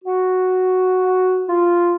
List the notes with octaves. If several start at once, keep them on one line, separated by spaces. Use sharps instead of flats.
F#4
F4